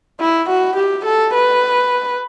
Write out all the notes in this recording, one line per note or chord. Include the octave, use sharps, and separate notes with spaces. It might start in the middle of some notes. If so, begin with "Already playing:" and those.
E4
F#4
G4
A4
B4